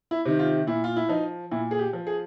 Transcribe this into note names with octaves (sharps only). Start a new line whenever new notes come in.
E4
C3 D#3
F4
A#2 E4
F4
E4
F3 D#4
A#2 E4
G#4
G4
F3
G#4